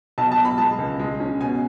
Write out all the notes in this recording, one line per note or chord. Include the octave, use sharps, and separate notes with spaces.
B1 A5
A5
B1
B5
G#3 A5
C#2
G#3
C#4
B2 G#5